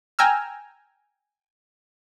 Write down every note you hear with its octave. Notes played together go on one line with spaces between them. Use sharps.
G5 G#5 A#5 E6 F6